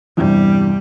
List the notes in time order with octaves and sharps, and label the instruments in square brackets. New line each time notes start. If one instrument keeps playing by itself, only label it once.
[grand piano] E2 G2 C3 [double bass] G3